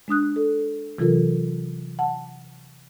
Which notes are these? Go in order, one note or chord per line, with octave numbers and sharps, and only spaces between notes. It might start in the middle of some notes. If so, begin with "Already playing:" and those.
G#3 D4 D#6 F#6
A4
C3 E3 F#3 F4 A4 A#4
F#5 A5